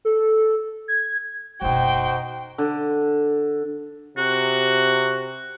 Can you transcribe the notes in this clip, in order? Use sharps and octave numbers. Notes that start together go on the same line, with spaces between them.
A4
G#6
F#1 B2 D#4 F#4 C5 G5
D3
C3 F#4